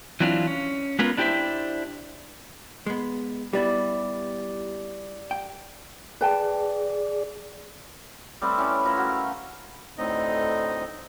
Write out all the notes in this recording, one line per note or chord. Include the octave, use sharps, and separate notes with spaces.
E3 F#3 C4 D4 E4 F4
C#4
G#3 B3 C#4 F4 A#4 B4
D4 E4 G4 A#4 C5 E5
G#3 B3
G3 B3 E4 G4 D5
G5
G#4 B4 D5 G5 A5
G3 A3 C4 B4
C#4 E4 G4
F3 A3 E4 A#4
F#4 G5
F5
D2 A2 D3 C4 D#4 D#5